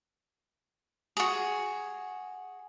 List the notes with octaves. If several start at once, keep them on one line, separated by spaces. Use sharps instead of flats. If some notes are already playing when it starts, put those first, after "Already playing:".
F#4 G#4